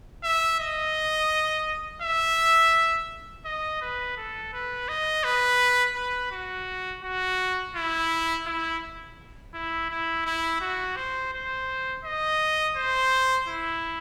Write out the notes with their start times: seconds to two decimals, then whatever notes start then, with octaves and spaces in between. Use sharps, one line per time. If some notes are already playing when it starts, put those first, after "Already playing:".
0.24 E5
0.60 D#5
2.02 E5
3.45 D#5
3.81 B4
4.17 A4
4.53 B4
4.89 D#5
5.24 B4
5.96 B4
6.31 F#4
7.03 F#4
7.75 E4
8.46 E4
9.54 E4
9.90 E4
10.26 E4
10.61 F#4
10.97 C5
11.33 C5
12.04 D#5
12.76 C5
13.48 E4